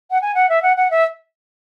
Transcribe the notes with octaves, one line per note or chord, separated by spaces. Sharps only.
F#5
G#5
F#5
E5
F#5
F#5
E5